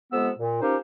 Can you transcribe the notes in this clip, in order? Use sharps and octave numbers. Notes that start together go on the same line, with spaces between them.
F2 C3 G#3 B3 E6
A#2
F3 A#3 C#4 D#4 G4 C5